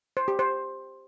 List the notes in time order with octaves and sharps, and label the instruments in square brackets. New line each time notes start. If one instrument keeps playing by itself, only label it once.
[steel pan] C5
G4
C5